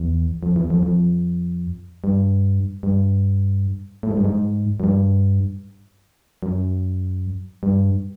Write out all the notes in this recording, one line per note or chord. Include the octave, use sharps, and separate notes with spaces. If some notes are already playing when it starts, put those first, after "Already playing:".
Already playing: E2
F2
E2
F2
F2
G2
G2
A2
G#2
G2
G#2
F#2
G2
F#2
G2